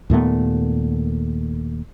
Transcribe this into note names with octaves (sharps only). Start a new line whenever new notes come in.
D#2 A#2 A3 B3